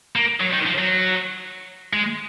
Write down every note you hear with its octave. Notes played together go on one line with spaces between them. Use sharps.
A#3
F#3
D#3
F3
F#3
G#3